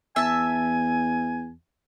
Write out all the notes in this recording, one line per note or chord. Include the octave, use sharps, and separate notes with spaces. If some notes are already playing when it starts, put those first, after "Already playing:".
E2 E5 G#5 A5